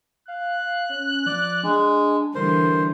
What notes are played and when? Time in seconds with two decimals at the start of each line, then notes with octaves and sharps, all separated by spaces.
0.28 F5 F#6
0.89 C#4
1.26 F3 D5
1.64 G#3 D4
2.35 D3 E3 G3 A#4 C5